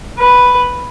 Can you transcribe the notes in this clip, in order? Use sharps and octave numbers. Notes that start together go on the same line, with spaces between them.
B4